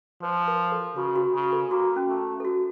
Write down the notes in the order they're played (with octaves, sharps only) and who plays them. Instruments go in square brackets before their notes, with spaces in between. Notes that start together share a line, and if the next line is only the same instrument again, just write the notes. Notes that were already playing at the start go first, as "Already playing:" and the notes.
[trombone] F3 [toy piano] C5
[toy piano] A#4
A4
[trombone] C#3 [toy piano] F#4
[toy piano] F#4
[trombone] C#3
[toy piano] A4
[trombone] A#3 [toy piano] F#4
[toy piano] C#4
[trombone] A3
[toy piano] A4
F#4